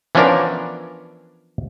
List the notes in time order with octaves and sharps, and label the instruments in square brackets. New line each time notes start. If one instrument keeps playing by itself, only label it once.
[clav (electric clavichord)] E3 F3 B3 C#4 D4 A#4